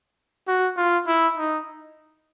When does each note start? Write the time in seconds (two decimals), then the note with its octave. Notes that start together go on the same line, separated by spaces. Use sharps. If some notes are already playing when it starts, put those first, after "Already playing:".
0.48 F#4
0.77 F4
1.07 E4
1.37 D#4